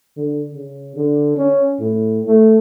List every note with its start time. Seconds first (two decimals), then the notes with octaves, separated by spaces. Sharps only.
0.17 D3
0.54 C#3
0.96 D3
1.37 C#4
1.80 A2
2.26 A3